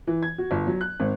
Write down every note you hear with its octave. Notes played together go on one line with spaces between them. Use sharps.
E3
G#6
F#4
G1
F#3
F#6
G#1